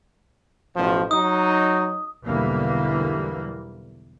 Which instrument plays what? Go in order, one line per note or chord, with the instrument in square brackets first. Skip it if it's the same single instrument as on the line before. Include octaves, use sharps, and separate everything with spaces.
[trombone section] A1 B2 F3
[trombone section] F#3 D#4 [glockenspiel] D#6
[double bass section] B1 E2 D3 E3 G3 A#3